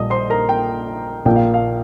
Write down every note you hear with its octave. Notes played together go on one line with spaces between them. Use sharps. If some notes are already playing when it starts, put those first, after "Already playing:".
Already playing: A#1 A#2 G3 D#5 D#6
C5 C6
A#4 A#5
G5
A#1 A#2 F3 A#3 F4 G5
F5
F5